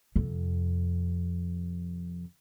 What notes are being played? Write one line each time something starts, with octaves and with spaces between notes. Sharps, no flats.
F2 C3